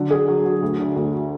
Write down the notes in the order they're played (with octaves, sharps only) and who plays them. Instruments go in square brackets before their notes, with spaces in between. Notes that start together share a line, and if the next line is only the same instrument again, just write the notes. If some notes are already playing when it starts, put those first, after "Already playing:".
Already playing: [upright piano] D3 F#3
G#4
F#3
F#3
D2
D3
D2